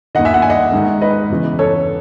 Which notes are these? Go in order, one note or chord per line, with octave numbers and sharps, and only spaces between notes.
D#2 D#3 D#5 F#5
E5 G#5
F#5
G#5
D#5 F#5
G#2 D#3
B4 D#5
E2 C#3 E3
A4 C#5